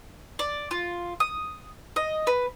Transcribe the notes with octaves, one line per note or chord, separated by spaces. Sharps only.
D5
F4
D#6
D#5
B4